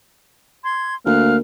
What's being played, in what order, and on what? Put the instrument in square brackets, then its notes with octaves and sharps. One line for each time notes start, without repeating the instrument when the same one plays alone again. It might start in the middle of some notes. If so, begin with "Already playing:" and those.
[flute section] C6 G#6
[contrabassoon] D2 [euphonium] A#3 [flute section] F5 F6 F#6